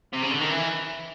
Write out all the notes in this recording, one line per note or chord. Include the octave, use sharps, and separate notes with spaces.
C3
C#3
D3
D#3
E3